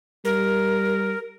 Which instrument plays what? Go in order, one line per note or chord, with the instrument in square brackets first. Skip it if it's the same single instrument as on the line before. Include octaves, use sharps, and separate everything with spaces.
[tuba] G3 [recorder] A#4